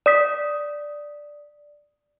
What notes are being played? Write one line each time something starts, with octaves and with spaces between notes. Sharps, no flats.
D5 D#6 B6